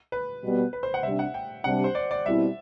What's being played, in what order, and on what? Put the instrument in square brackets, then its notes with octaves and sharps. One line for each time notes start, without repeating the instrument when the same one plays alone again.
[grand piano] B4
[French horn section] B2 G3 B3
[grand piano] B4
C5
F#5
[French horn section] C3 G3 D4 [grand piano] E5
[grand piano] F#5
G5
[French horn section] C3 G3 D4 [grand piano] F#5
[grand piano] C5
D5
D5
[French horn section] B2 G3 C4 E4 [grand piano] E5